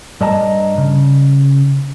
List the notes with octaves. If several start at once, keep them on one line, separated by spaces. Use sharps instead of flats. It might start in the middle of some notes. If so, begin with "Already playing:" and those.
G2 D5 D#5 A5 A#5
C#3